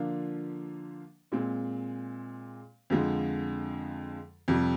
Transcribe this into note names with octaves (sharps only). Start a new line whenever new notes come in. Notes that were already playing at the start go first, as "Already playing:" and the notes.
Already playing: D3 F3 A#3 D4 F4
A#2 G#3 C4
F2 D3 F3 G#3
F2 C3 G3